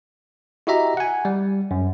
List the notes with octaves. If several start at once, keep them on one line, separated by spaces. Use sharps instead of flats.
E4 F#4 G4 D#5 E5 A#5
F#5 G#5
G3
F#2